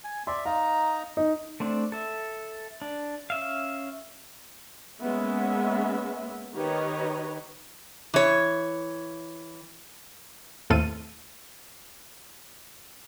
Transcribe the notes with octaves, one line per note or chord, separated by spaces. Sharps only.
G#5
D5 E5 C6
D#4 F5 A#5
D#4
A3 C4 D4
A4 E5
D4
C#4 E5 F5
G#3 A#3 B3 C#4 E5
D#3 G4 B4 C#5 D#5
E3 C#5
D#2 A2 C4 A4 F5 D#7